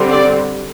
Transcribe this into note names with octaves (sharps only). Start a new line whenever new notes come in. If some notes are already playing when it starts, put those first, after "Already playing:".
Already playing: D3 G3 C4
D5